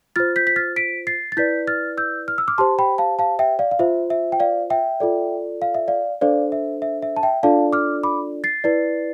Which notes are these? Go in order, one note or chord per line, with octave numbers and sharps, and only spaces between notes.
F4 C5 F6 A6
G6 B6
B6
F6 A6
B6 D7
A6 C7
A6
E4 B4 D5 G6 B6
F6 A6
E6 G6
F6
E6
D6 F6
G4 C5 A5 C6
G5 B5
F5 A5
F5 A5
E5 G5
D5 F5
F5
F4 C5 E5
E5
G5
D5 F5
E5 G5
F4 A4 D5
F5
E5
D5 F5
D4 A4 C5 D5 F5
E5
E5
E5
A5
E5 G5
D4 F4 A4 D5 F5 A5
D6 F6
B5 D6
A6 C7
E4 B4 D5